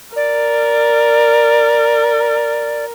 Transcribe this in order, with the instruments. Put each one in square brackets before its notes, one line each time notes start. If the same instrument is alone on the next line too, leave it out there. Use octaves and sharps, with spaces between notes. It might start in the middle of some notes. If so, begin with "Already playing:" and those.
[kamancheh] A#4 [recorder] D5